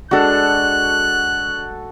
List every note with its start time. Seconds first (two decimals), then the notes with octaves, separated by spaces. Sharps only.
0.11 G#3 D4 F#4 A4 F#6